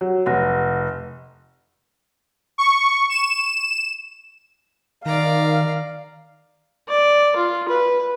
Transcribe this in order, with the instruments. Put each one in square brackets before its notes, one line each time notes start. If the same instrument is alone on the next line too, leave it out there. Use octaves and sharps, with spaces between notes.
[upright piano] F#3 [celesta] C#5
[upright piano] F1 [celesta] F#5 F#6 A#6
[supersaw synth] C#6
E7
[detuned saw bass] D#3 [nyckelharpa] D5 A#5 [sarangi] F5
[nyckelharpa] D5
F4
B4